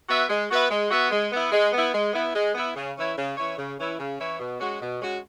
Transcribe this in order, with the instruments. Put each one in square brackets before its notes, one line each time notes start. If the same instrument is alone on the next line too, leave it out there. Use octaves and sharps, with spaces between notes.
[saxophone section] B3 F#4 B4 E5
G#3
B3 F#4 B4 E5
G#3
B3 F#4 B4 E5
G#3
B3 E4
G#3
B3 E4
G#3
B3 E4
G#3
B3 E4
C#3
E3 C#4 E4 C#5
C#3
E3 C#4 E4 C#5
C#3
E3 C#4 E4 C#5
C#3
E3 C#4 E4 C#5
B2
G#3 C#4 F#4
B2
G#3 C#4 F#4